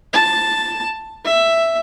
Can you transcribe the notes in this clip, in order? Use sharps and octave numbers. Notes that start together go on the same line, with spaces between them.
A5
E5